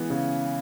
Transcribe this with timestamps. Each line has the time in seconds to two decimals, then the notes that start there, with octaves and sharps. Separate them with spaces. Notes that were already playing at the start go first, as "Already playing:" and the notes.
Already playing: E3 G#3 B3
0.10 C#3